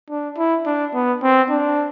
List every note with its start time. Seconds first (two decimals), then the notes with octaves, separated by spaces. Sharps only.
0.10 D4
0.38 E4
0.66 D4
0.94 B3
1.23 C4
1.50 D4